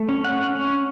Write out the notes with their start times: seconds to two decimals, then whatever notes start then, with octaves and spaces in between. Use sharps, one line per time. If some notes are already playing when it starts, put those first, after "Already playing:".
Already playing: A3
0.09 C#4
0.24 F#5
0.32 C#4
0.55 C#4